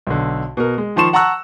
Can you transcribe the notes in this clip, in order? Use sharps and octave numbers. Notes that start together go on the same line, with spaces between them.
B1 D3
B2 A#4
G#3
D#3 F3 A5 C6 C#6 E7
F#5 A5 A#5 C#6 E6 F#6